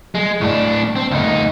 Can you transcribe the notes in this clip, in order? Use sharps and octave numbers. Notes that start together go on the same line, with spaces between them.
G#3
A2 D4
C4
D2 D#4